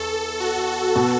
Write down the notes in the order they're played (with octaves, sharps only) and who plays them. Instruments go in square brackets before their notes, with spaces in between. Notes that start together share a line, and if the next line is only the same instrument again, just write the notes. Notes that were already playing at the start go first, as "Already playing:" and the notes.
Already playing: [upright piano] E2 [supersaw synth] A4
[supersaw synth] F#4
[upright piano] B2 B3 F#4 A4